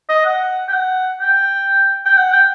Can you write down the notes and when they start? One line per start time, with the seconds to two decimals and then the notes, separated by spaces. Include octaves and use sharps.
0.09 D#5
0.25 F#5
0.69 G5
0.73 F#5
1.21 G5
2.06 G5
2.18 F#5
2.33 G5